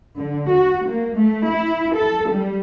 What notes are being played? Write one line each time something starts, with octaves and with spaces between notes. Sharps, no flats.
D3
F#4
A#3
A3
E4
A4
G3